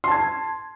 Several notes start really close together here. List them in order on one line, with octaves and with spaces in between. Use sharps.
C6 A5 G#6